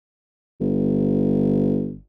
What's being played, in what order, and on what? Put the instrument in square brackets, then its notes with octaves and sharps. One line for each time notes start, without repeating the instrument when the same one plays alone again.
[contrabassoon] G1